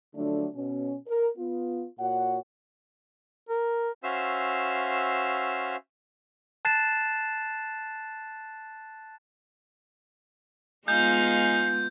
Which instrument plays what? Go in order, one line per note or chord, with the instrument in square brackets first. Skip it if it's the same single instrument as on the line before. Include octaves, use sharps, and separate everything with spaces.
[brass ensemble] D3 F3 F#3 A3 D4
B2 C#4
A#4
B3 F4
A#2 F#4 C#5 F#5
[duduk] A#4
[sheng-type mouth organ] C#4 F#4 C5 E5 F5 E6
[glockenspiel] A5 F#6 A6 C7 E7
[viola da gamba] G#3 B3 F4 [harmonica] D#4 G#4 F5 [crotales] G6